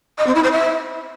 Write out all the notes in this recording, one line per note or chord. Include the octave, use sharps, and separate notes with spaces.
D#5
C4
E4
C5
E5